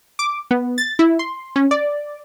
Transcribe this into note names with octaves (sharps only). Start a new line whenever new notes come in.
D6
B3
A6
E4
C6
C#4
D5